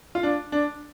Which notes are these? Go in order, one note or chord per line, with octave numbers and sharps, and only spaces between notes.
F4
D4
D4